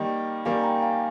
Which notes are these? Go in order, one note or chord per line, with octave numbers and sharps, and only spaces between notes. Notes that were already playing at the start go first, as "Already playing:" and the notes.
Already playing: D#3 G3 A#3 D#5 G5
D#3 G3 A#3 F5 G#5
G5 A#5
F5 G#5